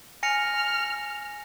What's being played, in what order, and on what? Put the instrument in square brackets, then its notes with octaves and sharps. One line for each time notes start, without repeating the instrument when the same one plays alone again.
[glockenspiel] G#5 A#6 C#7 [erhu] F6